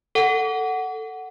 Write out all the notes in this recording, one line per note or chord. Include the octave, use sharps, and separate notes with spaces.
A4 F#5